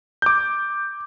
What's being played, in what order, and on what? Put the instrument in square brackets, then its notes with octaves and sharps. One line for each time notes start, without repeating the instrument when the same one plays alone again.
[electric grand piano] D6 G6